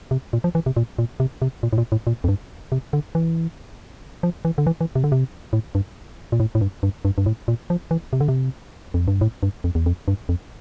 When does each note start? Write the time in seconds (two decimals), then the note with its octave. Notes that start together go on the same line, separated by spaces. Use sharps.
0.11 C3
0.33 A#2
0.44 F3
0.55 E3
0.66 C3
0.77 A#2
0.99 A#2
1.20 C3
1.42 C3
1.63 A#2
1.73 A2
1.78 A#2
1.92 A2
2.07 A#2
2.24 F2
2.28 G2
2.72 C3
2.93 D3
3.15 E3
4.23 F3
4.45 E3
4.58 D3
4.67 E3
4.81 E3
4.95 C3
5.04 D3
5.12 C3
5.53 A2
5.75 G2
6.32 A#2
6.40 A2
6.55 A2
6.61 G2
6.83 G2
7.05 G2
7.18 G2
7.26 A2
7.48 A#2
7.70 F3
7.91 E3
8.13 C3
8.20 D3
8.28 C3
8.94 F2
9.08 G2
9.21 A2
9.43 G2
9.64 F2
9.75 E2
9.86 F2
10.08 G2
10.29 F2